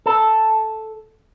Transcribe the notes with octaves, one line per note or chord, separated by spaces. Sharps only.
A4